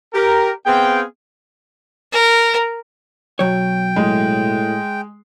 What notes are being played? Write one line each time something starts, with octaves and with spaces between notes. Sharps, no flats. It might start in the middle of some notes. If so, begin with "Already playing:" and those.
G4 A#4
B3 C4 G#4 F5 G5
A#4
B1 F#3 C#5 G5
A2 G#3